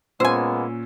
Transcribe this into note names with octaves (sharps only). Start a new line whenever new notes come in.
A#2 G#3 A#3 B3 C#4 C5 G#5 E6